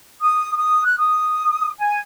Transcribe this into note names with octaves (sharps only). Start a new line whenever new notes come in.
D#6
D#6
F#6
D#6
G#5